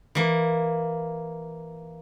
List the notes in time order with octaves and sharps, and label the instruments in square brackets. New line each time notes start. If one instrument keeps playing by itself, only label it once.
[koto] E3 A#3